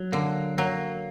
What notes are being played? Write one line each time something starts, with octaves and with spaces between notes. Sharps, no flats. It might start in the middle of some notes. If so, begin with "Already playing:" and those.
Already playing: F#3
D3 A#3
F#3 A#3